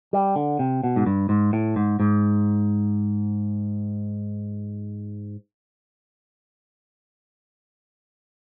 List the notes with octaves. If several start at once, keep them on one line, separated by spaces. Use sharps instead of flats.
G3
D3
C3
B2
G#2
G2
G#2
A2
G#2
G#2